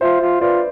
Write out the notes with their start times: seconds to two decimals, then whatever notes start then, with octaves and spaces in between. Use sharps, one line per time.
0.01 F4 C5 E5
0.21 F4
0.41 F4 B4 D5